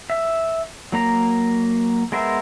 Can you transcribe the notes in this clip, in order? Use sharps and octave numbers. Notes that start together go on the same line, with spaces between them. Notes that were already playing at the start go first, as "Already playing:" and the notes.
E5
F#3 A#3 A#5
G#3 B3 A#4 C5 E5